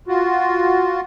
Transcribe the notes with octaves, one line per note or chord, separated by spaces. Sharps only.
F4 F#4